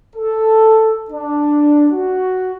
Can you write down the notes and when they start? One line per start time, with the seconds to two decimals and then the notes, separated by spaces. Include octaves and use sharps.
0.15 A4
1.10 D4
1.91 F#4